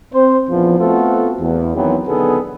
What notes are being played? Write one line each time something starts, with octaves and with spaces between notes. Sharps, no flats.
C4 C5
A#1 E2 F3
A3 B3 C4 F4 F#4 A4
E2
D#3 E3 F#3 B3 C4
B1 D3 D#3 B3 G#4 A4